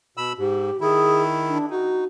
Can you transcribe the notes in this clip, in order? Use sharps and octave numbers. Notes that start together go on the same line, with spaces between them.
B2 B5 E6
G#2 G4
D#3 E4 G#4
D4
D#4 F#4